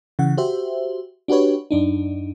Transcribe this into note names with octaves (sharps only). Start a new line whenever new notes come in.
C#3 E3 F#5
F#4 G4 C5 E5
D4 F#4 G4 B4 C#5
F#2 D4 D#4